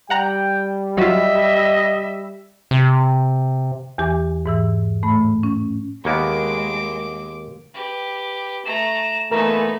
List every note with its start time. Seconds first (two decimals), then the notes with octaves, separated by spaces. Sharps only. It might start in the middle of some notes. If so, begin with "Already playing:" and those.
0.10 G3 F#5 G5 A#5 F#6
0.98 F#3 F4 D#5 E5
2.71 C3
3.98 E2 E3 G4 G#5 D6
4.46 G#2 E3 E6
5.03 A2 A3 B5
5.43 C#4
6.05 D#2 G#3 A#3 B3 D6
7.75 G4 B4
8.65 A3 A#5 E7
9.31 A#2 E3 A3 B3 D#4 A#4 A#5